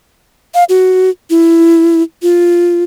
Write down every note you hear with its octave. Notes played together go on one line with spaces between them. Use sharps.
F5
F#4
E4
F4